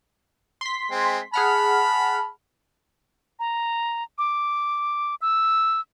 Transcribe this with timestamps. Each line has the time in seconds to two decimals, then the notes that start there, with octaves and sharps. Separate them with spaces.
0.61 C6 B6
0.91 G#3 C4
1.34 G#4 F#5 A5 B5 F6
3.39 A#5
4.18 D6
5.22 E6